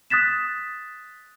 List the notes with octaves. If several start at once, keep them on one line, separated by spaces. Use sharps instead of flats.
D#6 F#6 A6 B6 E7